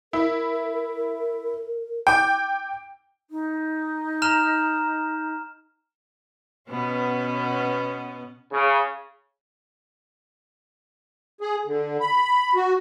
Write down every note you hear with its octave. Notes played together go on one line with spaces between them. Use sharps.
E4 A#4
G5 D6
D#4
A#5 F6 E7
B2 B3 C#4
C#3
G#4
D3
B5
F#4